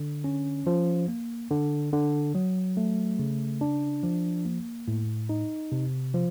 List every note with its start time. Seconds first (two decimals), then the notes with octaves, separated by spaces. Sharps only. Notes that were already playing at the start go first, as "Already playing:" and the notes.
Already playing: D3
0.24 C#4
0.67 F3
1.08 A#3
1.50 D3
1.93 D3
2.35 F#3
2.77 A3
3.19 C#3
3.61 D4
4.03 F3
4.45 A#3
4.88 A2
5.29 D#4
5.72 C3
6.14 F3